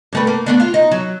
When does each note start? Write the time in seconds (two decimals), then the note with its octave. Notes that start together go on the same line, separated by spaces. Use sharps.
0.13 G2 A3 B4
0.27 A#3
0.46 A3 B3 D4
0.60 F4
0.74 D#4
0.91 F#3